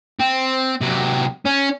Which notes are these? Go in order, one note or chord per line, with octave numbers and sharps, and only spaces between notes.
C4
C3 F#3
C#4